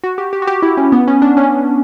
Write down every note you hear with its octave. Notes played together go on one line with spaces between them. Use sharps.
F#4
G4
G4
F#4
G4
E4
C#4
B3
C#4
D4
C#4